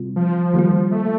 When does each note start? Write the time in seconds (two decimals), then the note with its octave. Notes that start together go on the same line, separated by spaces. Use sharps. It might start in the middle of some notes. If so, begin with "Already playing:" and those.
Already playing: C3 G3 C4 F4
0.16 F3
0.54 D#3 G3 A#3 F4
0.91 A3